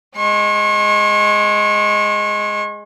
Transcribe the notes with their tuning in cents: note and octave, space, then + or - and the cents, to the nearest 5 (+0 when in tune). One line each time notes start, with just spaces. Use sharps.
G#3 +0 C#6 -40